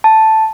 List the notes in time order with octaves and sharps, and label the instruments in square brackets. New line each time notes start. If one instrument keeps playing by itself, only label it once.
[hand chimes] A5